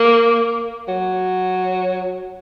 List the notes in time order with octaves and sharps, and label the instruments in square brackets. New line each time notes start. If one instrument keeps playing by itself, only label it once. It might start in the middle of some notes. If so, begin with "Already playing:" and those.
Already playing: [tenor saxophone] A#3
F#3